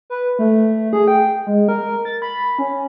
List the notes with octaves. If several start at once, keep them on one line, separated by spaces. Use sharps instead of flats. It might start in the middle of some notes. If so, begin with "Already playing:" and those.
B4
A3
G#4
G5
G#3
A#4
A6
B5
C#4